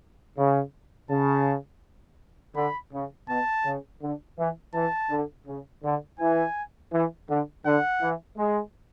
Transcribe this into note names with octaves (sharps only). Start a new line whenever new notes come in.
C#3
C#3 A5
D3 B5
C#3
B2 A5
C#3
D3
E3
E3 A5
D3
C#3
D3
E3 G#5
E3
D3
D3 F#5
E3
G#3